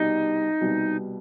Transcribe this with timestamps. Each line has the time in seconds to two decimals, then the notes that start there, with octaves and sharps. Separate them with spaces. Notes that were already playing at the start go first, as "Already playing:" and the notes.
Already playing: C2 B2 G3 D#4
0.61 C2 B2 G3